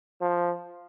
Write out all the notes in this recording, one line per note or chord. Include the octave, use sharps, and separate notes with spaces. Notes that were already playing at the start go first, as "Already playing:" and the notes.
F3